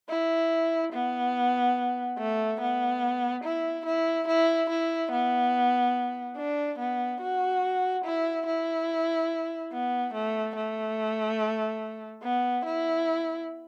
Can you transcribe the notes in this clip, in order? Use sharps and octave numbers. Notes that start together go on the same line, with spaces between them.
E4
B3
A3
B3
E4
E4
E4
E4
B3
D4
B3
F#4
E4
E4
B3
A3
A3
B3
E4